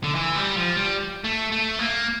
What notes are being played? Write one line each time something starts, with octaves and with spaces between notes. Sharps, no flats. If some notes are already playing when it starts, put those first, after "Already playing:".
D3
E3
G3
F3
G3
A3
A3
A#3